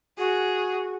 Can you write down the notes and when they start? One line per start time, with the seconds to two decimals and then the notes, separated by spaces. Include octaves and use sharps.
0.18 F#4 G#4